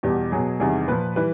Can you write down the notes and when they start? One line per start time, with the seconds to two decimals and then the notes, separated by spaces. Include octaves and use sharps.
0.03 E2 B2 G3 G4
0.32 B2 F#3 G#4
0.60 E2 C3 D#3 G3 G#4
0.88 A#2 F3 B4
1.16 E3 G3 B4